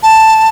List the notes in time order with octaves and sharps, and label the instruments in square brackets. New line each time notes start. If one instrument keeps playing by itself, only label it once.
[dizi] A5